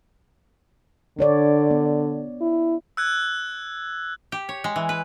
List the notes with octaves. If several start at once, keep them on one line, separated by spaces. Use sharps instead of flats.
D3 D4 C#5 D5
B3
E4
E6 F#6 G#6
G4
C#5
G#3
E3
B4